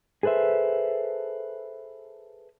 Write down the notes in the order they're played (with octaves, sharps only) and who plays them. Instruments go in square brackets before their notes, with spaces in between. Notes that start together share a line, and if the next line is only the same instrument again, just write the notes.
[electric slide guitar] G#4 A4 B4 C5 E5